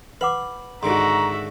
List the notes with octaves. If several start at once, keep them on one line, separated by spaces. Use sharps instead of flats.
B4 F#5 B5 D6
G#2 D3 D#3 F#4 E5 A#5 C6